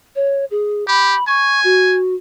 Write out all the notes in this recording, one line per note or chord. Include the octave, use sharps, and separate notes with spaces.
C#5
G#4
G4 B5
G#5 C#6
F#4